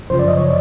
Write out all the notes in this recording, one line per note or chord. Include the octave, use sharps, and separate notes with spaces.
F#2 C#3 F3 C5
D5
D#5
C#5